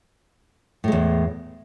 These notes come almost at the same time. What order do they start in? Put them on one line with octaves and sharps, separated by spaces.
A2 G#3 E2